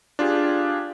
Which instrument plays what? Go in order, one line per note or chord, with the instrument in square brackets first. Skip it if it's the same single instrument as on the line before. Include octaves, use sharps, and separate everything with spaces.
[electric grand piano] D4 F4 G4 G#4